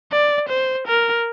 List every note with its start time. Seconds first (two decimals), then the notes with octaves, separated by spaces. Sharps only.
0.12 D5
0.49 C5
0.87 A#4